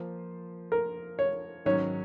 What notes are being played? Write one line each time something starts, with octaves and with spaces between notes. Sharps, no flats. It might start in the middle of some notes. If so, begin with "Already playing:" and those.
Already playing: F3 A#3 F4 C5
A#4
C#5
G#2 D#3 F#3 C#4 C#5